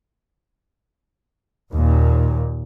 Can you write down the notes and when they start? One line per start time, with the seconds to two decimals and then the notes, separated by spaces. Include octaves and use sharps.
1.73 D#2 A#2